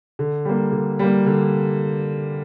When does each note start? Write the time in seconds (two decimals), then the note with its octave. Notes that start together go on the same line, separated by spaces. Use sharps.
0.19 D3
0.45 G3 A#3
0.72 D3
0.99 G3 A#3
1.26 D3